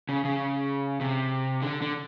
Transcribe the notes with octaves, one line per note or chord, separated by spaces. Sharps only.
C#3
C#3
C3
D3
D3